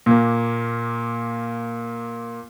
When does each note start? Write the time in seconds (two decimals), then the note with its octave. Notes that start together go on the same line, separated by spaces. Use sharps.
0.06 A#2 A#3